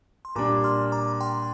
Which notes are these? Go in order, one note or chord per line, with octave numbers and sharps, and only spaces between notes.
C6
A#2 G3 D4 A#5 D6
C6 F6
A#5 D6
G5 C6